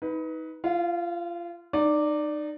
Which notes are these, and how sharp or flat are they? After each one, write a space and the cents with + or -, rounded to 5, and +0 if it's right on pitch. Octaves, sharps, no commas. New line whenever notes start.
D#4 +30 B4 +0
F4 -25 F5 +25
D#4 -30 D5 +0